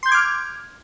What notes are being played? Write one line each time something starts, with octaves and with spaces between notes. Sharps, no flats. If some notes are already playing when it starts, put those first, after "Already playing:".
C6 D6 F6 G6 G#6